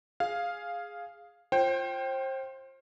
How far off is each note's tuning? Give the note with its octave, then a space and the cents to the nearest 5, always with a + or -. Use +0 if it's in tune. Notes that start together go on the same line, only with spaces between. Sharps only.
G#4 +0 F5 +0
F4 +0 C5 +30 G5 -10